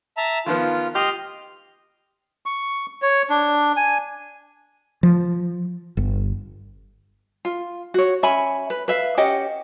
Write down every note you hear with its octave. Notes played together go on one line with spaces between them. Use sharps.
E5 A5 A#5
D#3 F3 B3 F4
G4 D#5 C6 F6
C#6
C#5
D4
G#5
F3
G1
F4
F#4 C#5
C#4 E5 G#5 B5
B4
B4 E5 F5
C#4 G4 D#5 F#5